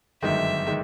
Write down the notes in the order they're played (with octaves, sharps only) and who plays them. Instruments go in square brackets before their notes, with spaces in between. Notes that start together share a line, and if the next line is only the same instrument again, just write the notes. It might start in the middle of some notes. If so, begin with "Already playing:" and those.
[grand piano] G1 F#2 D#3 G#3 [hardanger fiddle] E5
[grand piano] D#3 G#3